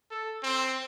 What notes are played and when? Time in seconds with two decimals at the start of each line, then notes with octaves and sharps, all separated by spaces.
0.11 A4
0.43 C4